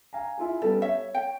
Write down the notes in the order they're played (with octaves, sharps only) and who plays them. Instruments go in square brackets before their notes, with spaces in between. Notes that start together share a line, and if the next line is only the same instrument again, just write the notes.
[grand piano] F5 G#5 A#5
E4 F4 G#4
[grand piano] G3 B3 C#4 [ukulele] A4
[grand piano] C#5 [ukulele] E5
[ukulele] G5